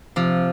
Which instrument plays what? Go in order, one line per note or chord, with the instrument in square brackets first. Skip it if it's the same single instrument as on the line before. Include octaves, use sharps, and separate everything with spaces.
[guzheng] C3 F3